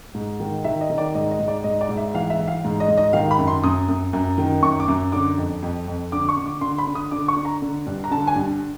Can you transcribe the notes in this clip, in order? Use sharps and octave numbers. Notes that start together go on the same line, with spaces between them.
G#2
D#3
D#3 E5
D#5
D#3
D5
G#2 D#5
D#5
G#2
D5
G#2 D#5
D5
G#2
E5
E3 F5
E5
E3
F5
G#2
D#5
G#2
D#5
D#3 F5
B5
F#2
C6
F#2 D#6
F#2
F#2
D#3
F#2 C#6
D6
F#2
D3 D6
F2
F2
F2
D3 D6
C#6
D3
D6
D3 C6
B5
D3
D#6
D3 D6
C#6
D3
A#5
D3
G2
A#5
D3 A5
G#5
G2